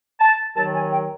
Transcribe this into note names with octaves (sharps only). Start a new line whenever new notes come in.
A5
D#2 D#3 F#3 A5
G#5
G5